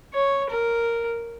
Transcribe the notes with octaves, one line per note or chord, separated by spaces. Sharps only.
C#5
A#4